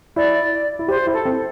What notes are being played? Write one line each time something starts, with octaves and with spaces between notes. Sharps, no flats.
E4 D5
E4
G4 C5
E4
A4
C4